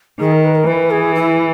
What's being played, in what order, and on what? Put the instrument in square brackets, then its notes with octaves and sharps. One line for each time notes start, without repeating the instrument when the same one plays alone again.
[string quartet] D#3 [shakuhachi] G#4
[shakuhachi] A#4
B4
A#4
[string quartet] E3 [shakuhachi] B4
[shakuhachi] G#4
E4